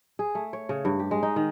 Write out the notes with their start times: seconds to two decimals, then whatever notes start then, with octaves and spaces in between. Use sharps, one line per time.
0.19 G#4
0.35 A3
0.53 C#5
0.69 C#3
0.85 G2
0.99 G4
1.11 G#3
1.23 D#4
1.36 D#3